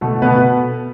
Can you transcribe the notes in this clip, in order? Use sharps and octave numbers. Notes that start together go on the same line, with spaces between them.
B2 A3 A4
B2 B3 B4